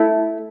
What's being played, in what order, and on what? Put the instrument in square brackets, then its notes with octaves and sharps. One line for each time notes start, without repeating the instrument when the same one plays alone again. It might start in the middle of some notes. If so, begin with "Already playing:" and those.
Already playing: [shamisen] A3 [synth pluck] E4